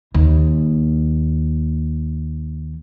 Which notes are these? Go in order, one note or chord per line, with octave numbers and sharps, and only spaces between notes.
D#2 A#3